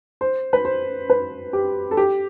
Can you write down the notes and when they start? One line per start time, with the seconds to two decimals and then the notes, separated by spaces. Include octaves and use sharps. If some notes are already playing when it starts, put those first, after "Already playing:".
0.21 C5
0.53 B4
0.65 C5
1.10 B4
1.53 G4
1.91 A4
1.97 G4